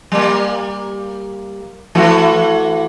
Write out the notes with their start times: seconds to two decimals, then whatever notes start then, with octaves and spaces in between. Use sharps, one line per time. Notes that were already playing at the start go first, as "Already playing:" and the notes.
0.12 G3 A#3
1.95 E3 A3 F#4